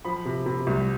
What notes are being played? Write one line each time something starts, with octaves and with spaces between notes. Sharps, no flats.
F3 B5
C3
C3
C2